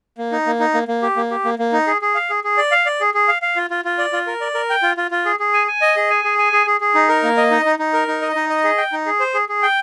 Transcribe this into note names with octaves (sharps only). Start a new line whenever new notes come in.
A#3
D#4
A#3
D#4
A#3
A#3
G4
A#3
G4
A#3
A#3
D#4
G#4
G#4
F5
G#4
G#4
D5
F5
D5
G#4
G#4
F5
F5
F4
F4
F4
D5
F4
A#4
D5
A#4
G5
F4
F4
F4
G#4
G#4
G#5
G#5
D#5
G#4
G#5
G#4
G#5
G#4
G#4
G#4
D#4
A#4
A#3
D#5
D#4
D#4
D#4
A#4
D#4
D#5
D#4
D#5
G#4
G5
D#4
G#4
C5
G#4
G#4
G5